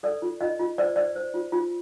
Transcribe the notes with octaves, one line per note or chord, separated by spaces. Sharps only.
A4 D5
F4
F4 D#5
F4
C5 D5
C5 D5
C5
F4
F4